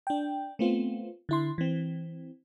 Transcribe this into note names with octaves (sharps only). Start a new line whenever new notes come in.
D4 G5
A3 B3 C4 F4
D3 E4 C6
E3 C4